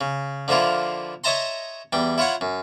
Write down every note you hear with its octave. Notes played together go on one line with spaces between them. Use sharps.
C#3
D3 F3 A#3 E4 F4
C#5 D#5 E5 A5 A#5 C6
E2 G3 G5
E4 F4 C#5 F#5
F#2